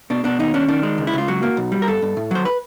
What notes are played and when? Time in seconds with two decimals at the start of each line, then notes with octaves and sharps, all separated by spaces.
0.10 B2 D4
0.24 B2 D4
0.39 D#2 D#4
0.54 C#4 D4
0.68 D#3 D4
0.83 G#3
0.98 C#2
1.07 E4
1.13 C#2 F4
1.28 F#3 F#4
1.43 A#3
1.57 B1
1.72 G3
1.82 A#4
1.87 G2 A4
2.02 G2
2.17 A2
2.31 F#3 C5
2.45 B4